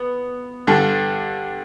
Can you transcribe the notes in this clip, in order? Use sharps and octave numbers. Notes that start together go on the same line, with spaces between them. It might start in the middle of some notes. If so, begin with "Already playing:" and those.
Already playing: B3
G2 D3